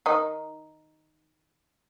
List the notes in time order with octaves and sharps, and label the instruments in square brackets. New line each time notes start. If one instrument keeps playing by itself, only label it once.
[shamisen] D#3 D#4